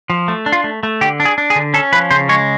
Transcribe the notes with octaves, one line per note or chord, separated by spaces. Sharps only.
F3
A3
D4
F4
A3
A3
D3 G4
D4
G#4
D4
G#4
D3
C#4 A4
F3 B4
C#3 C5
G#3 C#5